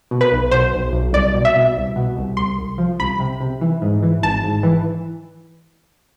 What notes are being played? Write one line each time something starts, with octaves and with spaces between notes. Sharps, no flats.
B2
B4
B1
B2 C5
B1
B1
C2 D5
B2
E5
B2
C2
B2
C2
C2 C6
C2
F3
C2 B5
C3
C3
E3
G#2
E3
G#1 A5
G#2
E3